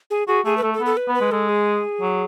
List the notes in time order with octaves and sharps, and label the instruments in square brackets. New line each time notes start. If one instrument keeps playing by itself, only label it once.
[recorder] G#4
[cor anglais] F#4 [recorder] G#4
[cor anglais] A3 [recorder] G#4
[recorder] B4
[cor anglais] A3 [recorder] A4
[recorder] A4
[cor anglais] B3
[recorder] A4
B4
[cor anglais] B3
[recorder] B4
[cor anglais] G#3
[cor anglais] G#3 [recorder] A4
[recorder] G#4
[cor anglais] F#3